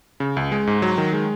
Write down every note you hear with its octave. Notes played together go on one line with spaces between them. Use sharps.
C#3
C#2
G#3
G#2
F#3
D#3
G#3